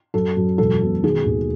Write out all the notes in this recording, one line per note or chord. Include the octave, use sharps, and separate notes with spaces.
F#2 A4
F#2
E1 A4
B2
D#3 G#4
D#2